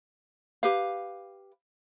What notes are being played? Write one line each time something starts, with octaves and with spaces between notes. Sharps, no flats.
G4 B4 F5